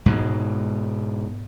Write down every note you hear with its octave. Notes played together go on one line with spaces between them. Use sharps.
G#2 B2 G#3